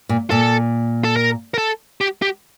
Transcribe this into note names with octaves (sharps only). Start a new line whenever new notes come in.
A#2
A#2 A4
A4
A#4
A#4
A4
G4
G4